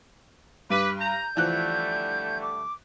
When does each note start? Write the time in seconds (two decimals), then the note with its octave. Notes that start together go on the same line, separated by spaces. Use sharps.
0.70 G2 B4 D6 D#7
0.99 A#5 G6
1.37 D3 E3 F3 G3 A3 F#6
2.41 D6